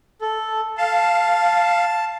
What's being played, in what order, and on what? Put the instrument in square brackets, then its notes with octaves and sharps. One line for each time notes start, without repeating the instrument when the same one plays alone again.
[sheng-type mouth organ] A4
[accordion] F5 [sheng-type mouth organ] A5